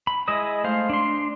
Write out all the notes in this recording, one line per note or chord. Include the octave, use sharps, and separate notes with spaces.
B5
G#3 E4 D#5 E5 D#6
A3 C5 F5
D4 C6